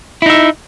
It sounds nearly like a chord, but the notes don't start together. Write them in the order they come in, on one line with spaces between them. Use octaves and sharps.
E4 D#4 E5